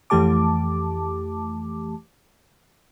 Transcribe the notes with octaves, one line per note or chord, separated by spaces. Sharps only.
F2 E3 A3 G4 A5 D6